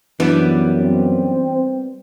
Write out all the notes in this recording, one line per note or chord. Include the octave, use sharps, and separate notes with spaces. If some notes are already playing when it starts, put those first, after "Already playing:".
F#2 E3 G3 B3 D4
C4